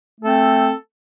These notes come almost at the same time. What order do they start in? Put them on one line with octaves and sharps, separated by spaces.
A3 A4 C4